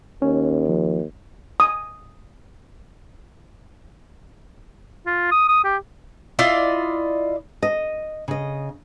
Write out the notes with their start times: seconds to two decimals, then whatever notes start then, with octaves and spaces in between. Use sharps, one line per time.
0.22 D#2 C#4
0.69 F3
1.60 D#6
5.07 F4
5.32 D#6
5.49 D#6
5.64 G4
6.39 E4 F4 D5 D#5
7.62 D#5
8.28 C#3 D#5